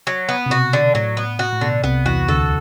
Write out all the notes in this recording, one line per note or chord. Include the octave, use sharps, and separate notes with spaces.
F#3
B3
C3
B2 F#4
D3
A2 F#3
B3
F#4
A2
B2 D3
C2 C3 B3
E2 E3 F#4
D2 D3 A4